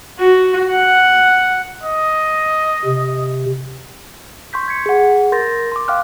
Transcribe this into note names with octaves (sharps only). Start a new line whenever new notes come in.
F#4
F#5
D#5
C3
C6 C#6 G6 B6
G#6 B6 C#7
G#4 F#5
A#4 C6 G6 A6 A#6
C6 D6
F5 G5 D6 F6 F#6